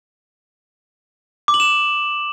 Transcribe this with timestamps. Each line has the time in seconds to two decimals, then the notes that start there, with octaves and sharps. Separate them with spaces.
1.48 D6
1.54 F#7
1.60 E7